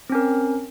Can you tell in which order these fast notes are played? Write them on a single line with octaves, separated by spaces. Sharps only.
C4 C#4 A#4